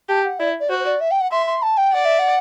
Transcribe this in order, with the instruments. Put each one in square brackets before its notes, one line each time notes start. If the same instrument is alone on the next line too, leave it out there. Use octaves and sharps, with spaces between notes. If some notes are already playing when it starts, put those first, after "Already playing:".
[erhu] G4 [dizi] A5
[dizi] F#5
[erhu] E4 [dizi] D5
[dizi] D5
[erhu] F#4 [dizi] C5
[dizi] C5
D5
E5
G5
F#5
[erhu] E5 [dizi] C6
[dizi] C6
A5
G5
[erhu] D5 [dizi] F#5
[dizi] E5
F#5